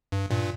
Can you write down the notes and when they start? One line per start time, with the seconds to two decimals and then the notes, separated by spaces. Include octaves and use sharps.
0.12 G2
0.29 G2 A#2